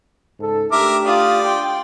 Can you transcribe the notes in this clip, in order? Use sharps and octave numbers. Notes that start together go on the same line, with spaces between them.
C#2 G#2 A4
A3 D4 G4 A#4 E5 D6
F4 D5 D#6
G5 C6